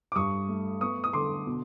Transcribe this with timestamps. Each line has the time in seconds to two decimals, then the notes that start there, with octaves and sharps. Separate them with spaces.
0.12 D6
0.16 G2 C#6 D#6
0.49 A3
0.81 B3 C#6 D#6
1.04 D#6
1.13 D3 C6 D6
1.47 B2